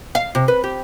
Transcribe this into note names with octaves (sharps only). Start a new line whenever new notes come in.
F5
C3
B4
G4